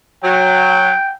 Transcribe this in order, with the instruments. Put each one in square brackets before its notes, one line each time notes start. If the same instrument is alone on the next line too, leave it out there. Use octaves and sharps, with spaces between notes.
[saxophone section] F#3 [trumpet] G5